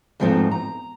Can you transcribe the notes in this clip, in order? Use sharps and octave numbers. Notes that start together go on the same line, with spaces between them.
E2 G#2 F3 A3 C4 D#4
A#5